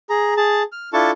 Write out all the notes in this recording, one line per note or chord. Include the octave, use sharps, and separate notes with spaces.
G#4 A#5
G#4 A5
F6
D4 E4 F4 A4 A5 C#6